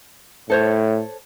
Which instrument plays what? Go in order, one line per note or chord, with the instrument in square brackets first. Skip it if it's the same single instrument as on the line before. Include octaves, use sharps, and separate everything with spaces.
[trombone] A2 [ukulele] A4 C5 C#5